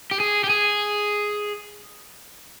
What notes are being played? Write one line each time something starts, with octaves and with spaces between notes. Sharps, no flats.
G4
G#4
G4
G#4